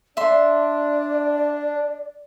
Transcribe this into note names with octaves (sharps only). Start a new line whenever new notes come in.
D4 D5 E5 C6